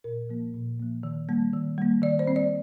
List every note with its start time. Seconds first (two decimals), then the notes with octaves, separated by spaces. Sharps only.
0.04 A#2 A#4
0.29 F3 A#3
0.54 A#2
0.79 F3 A#3
1.03 D#3
1.29 G3 A#3
1.53 D#3
1.78 G3 A#3
2.02 D#3 D5
2.19 C5
2.28 G3 C4
2.36 D5